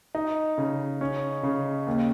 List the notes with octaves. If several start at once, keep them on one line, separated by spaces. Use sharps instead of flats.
D#4
C#3
C#4
C#3
D#2